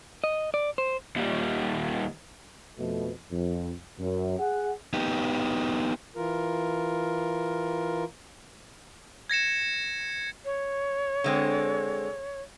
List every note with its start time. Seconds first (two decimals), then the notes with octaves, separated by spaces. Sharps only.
0.24 D#5
0.54 D5
0.78 C5
1.16 D#2 G3
2.79 F2 B2 A3
3.31 F2
3.99 F#2
4.39 G#4 F#5
4.93 B3 D#4 G4
6.16 E3 F4 A#4
9.30 G#6 A#6 C#7 E7
10.45 C#5
11.24 D3 G#3 C4